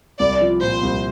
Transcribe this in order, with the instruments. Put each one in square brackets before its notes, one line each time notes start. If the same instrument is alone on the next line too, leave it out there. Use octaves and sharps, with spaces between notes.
[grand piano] C2 [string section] D5
[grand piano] F3
[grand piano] A#2 [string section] C5
[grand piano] C2